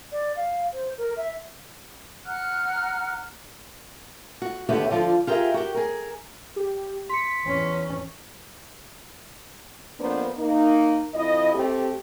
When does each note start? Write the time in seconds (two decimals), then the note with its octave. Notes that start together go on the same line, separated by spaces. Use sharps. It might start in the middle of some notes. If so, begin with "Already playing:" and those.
0.12 D5
0.36 F5
0.73 C5
0.98 A#4
1.17 E5
2.26 F#5 A#5 F6 F#6
4.42 F#4
4.69 D#2 D3 B3 F#4 G4 E5
4.91 D3 F3 F4 D5
5.27 F4 G4 G#4 A#4 E5
5.54 F#4 G4
5.74 G#4 A#4
6.56 G4
7.10 C6 B6 C#7
7.45 E2 C#4
10.00 F2 A#3 B3 D4 C5
10.38 A#3 D#4
11.14 F2 E4 D#5
11.54 A3 C4 G4